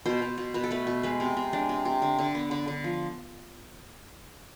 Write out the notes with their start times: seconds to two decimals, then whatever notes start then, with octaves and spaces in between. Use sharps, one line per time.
0.06 B2 C5
0.22 B2
0.38 B2
0.54 B2 B4
0.64 A4
0.71 A3 B4
0.87 B2
1.03 G#3 B4
1.20 C3
1.37 C3
1.53 G#3 D4
1.69 C3
1.85 C3
2.02 D3
2.19 D3
2.35 B3
2.51 D3
2.68 D3
2.84 F3